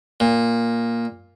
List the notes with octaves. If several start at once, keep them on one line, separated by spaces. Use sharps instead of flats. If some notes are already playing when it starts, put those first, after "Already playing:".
A#2